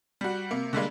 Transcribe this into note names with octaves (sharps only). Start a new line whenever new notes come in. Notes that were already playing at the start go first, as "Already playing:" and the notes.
G3 F#4
C3 A#3
D3 G3 G#3 A#3